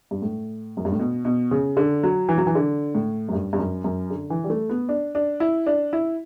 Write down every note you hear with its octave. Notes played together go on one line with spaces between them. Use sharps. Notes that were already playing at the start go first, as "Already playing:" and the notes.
G2
A2
F#2
G2
A2
B2
B2
C#3
D3
F#3
E3
F#3
E3
D3
A2
F#2
G2
G2
F#2
F#2
D3
E3
G3
A3
B3
D4
D4
E4
D4
E4